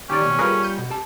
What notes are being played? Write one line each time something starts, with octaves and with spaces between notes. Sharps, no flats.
D#2 D#3 C#4 G4 D5
D#2 B2
G3 F4 G#4 A#4 B4
G6 C#7 D#7
B2
G4 A5